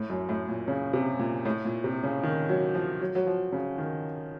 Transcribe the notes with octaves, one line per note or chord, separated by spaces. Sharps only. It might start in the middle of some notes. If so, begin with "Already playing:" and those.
Already playing: A2
F#2
A2
A#2
C#3
C3
A#2
A2
A#2
C3
C#3
D#3
F#3
F3
F#3
F#3
F3
C#3
D#3